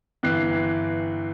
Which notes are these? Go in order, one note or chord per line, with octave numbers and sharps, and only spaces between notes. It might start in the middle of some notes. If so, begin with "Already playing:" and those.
G1 E3 G5 F#6 C7